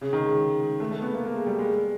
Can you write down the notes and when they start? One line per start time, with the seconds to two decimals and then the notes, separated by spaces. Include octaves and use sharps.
0.01 C#3
0.13 D#3
0.24 G#3
0.80 A3
0.91 A3
1.02 B3
1.13 A#3
1.25 A#3
1.36 G#3
1.47 G3
1.59 G#3